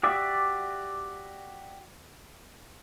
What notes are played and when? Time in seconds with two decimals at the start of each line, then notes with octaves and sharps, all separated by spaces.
0.03 F#4 G4 D5 E5